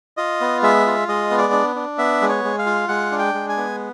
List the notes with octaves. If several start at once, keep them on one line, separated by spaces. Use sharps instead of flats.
F4 D#5
B3
G#3 E5
F4
G#3 D#5
B3
D5
D4
D4
B3 E5
G#3
C#5
G#3
F5
F4
G#3 F#5
D4
G5
G#3
G#5
B3